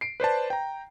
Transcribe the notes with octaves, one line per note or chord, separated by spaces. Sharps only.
C7 D7
B4 C5 D5 A5
G5 A#5